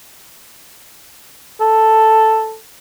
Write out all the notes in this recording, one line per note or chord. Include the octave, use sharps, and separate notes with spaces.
A4